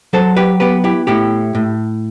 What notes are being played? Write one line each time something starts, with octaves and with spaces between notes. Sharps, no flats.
F#3 A4 C5
G4 B4
B3 G4 B4
E4 G4
A2 E4 G4
A2